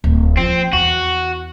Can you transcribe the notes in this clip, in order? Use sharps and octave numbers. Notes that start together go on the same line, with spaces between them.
D1
F3 C4
E2 F#4